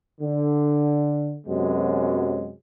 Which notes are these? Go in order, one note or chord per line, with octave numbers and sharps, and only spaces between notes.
D3
F#2 C3 F#3 G#3 B3